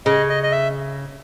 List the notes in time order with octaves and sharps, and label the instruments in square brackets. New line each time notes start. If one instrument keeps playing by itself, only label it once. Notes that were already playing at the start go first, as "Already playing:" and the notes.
[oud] C#3 [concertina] D#5
[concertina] D#5
D#5
E5